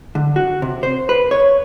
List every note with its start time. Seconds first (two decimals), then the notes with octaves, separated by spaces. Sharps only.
0.15 D3
0.36 F#4
0.62 C3
0.83 C5
1.09 B4
1.31 C#5